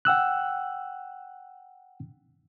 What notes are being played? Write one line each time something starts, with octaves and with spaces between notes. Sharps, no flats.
F#5 G5 E6 F#6